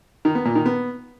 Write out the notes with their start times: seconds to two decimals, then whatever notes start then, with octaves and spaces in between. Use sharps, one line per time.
0.25 D#3
0.35 B3
0.45 A#2
0.55 D#3
0.66 B3